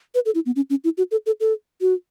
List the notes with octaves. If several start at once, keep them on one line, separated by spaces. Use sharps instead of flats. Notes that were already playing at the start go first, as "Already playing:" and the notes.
B4
A4
E4
B3
C#4
C#4
E4
F#4
A4
A4
A4
F#4